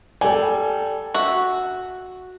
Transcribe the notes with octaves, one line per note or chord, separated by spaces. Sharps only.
G3 A4 G#5
F#4 E5